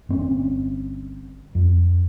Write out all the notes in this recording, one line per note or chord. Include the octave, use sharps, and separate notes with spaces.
G1 C4 C#4
F2